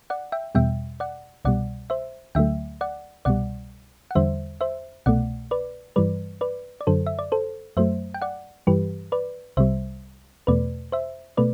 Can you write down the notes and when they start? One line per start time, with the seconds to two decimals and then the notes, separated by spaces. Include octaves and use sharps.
0.10 D5 F#5
0.32 E5 G5
0.55 E2 B2 G3 E5 G5
1.00 D5 F#5
1.45 C2 B2 G3 D5 F#5
1.90 C5 E5
2.35 D2 D3 F#3 A3 E5 G5
2.81 D5 F#5
3.25 C2 B2 G3 D5 F#5
4.11 F#5
4.15 E2 D3 G3 C5 E5
4.61 C5 E5
5.06 C2 B2 A3 D5 F#5
5.51 B4 D5
5.96 G2 E3 G3 B4 D5
6.41 B4 D5
6.81 D5
6.87 F#2 D3 F#3 A4 C5
7.06 E5
7.19 D5
7.32 A4 C5
7.77 F#2 F#3 A3 C5 E5
8.14 G5
8.22 D5 F#5
8.67 G2 E3 G3 G4 B4
9.12 B4 D5
9.57 C2 C3 G3 C5 E5
10.47 E2 B2 A3 B4 D5
10.92 C5 E5
11.37 B2 A3 B4 D5